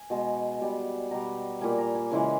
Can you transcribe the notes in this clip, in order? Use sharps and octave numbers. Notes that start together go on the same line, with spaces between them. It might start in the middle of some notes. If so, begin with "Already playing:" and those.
Already playing: G#5
B2 G#3
B2 G3
B2 G3 A#5
A#2 G3 G#5
A#5
G#5
C#3 E3 G#3